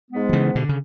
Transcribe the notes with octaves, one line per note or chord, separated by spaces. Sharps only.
G#2 G#3 B3
F#3
C#3 E3
B2 D3
C#3